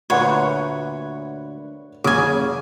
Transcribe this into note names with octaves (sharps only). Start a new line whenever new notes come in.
D2 A#2 B4 C#5 F#5
F#1 C#3 G#5 D6